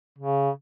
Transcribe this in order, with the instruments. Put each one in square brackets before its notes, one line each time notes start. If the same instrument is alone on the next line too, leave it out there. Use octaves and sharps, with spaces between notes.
[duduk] C#3